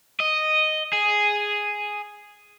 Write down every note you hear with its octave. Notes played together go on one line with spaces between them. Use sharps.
D#5
G#4